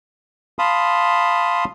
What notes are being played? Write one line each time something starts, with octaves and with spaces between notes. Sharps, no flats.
F5 A5 B5 C6 D#6